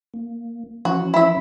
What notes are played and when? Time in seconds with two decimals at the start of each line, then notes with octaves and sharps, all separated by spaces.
0.14 A#3
0.85 E3 F3 C#4 F#4
1.14 E4 E5